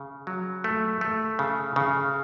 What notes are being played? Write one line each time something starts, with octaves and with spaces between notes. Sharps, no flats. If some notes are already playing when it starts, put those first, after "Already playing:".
Already playing: C#3
F#3
A3
A3
C#3
C#3